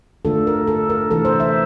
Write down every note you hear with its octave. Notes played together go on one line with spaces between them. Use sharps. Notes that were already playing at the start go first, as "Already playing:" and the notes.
D3 A3 D4 F4 A4
A#4
A4
A#4
C3 E3 A3 A4
C5
E5